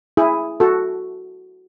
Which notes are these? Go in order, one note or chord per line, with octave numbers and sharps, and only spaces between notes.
E4 G#4
F#4 A4